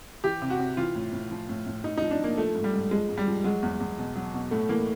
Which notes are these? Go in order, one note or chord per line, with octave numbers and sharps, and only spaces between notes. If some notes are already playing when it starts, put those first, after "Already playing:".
E3 G4
C3
F#4
C3
E3 F4
A2
A2
F3
A2
A2
A2 D#4
F3 D#4
D4
F3 A#3
F3 A3
G#2
G3
G#2
F3 G#3
G#2
G3
F3
F#3 G#3
E2
E2
B2
F#3
B2
A2 A3
E3 A#3